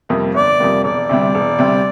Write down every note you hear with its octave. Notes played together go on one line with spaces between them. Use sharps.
F2 C3 G3 A#3
G1 D5
F2 C3 G3 A#3
E1 D5
D2 C3 G3
E1
D2 C3 G3